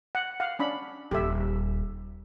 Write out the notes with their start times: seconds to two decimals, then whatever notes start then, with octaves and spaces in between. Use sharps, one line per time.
0.15 F#5
0.40 F5 F#5
0.59 C#4 D4 B5
1.11 D#1 G4 A4 E5